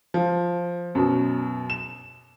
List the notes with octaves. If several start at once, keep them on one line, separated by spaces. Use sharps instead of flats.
F3
F#2 B2
E7